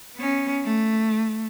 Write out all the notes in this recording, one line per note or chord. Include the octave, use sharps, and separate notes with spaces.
B3 C#4
A3